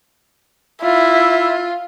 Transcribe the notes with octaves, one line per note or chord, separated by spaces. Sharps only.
E4 F4